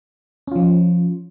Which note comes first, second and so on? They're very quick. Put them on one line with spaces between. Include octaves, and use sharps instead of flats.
C#4 F4 F3